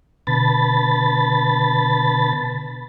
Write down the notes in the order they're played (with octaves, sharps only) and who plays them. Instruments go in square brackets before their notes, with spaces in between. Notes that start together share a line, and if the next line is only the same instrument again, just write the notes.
[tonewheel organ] B2 D3 B4 A5 B5 A6